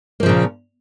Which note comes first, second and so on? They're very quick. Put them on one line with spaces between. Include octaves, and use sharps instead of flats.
A#3 F3 C#3 A#2